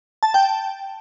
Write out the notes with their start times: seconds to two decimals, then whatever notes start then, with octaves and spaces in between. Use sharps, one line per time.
0.23 A5
0.34 G5